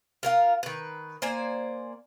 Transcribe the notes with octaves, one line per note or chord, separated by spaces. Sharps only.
F4 A#4 F5
D#3 B4
A#3 C5 D5 G#5